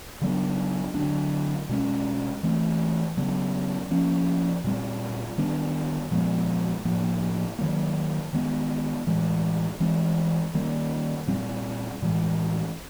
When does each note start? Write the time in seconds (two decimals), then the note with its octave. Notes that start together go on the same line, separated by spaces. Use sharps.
0.21 C#3 F#3 B3 D4
0.95 D3 F#3 A#3 D4
1.69 B2 G#3 C#4
2.43 E3 A3 C4
3.17 C#3 F#3 B3
3.91 F3 A#3 C#4
4.64 A#2 G3 C4
5.38 D#3 G3 B3 D4
6.11 A#2 F3 G#3 B3
6.85 A2 F3 A#3
7.59 D#3 F#3 A#3
8.33 D#3 G#3 B3
9.07 A2 E3 G#3
9.80 E3 G#3 C4
10.54 D#3 G3 A#3
11.28 A#2 G3 C4
12.02 A2 E3 G#3